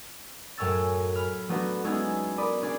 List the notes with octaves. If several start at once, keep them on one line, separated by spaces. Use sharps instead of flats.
F#2 A2 C#5 G#5 E6 A6
B5 F6
F#3 A3 B3 D4 F#4
G#3 B3 C#4 D#4 E4 G#4
A#4 D5 B5 D6 D#6
C#4 D4 G#4 D5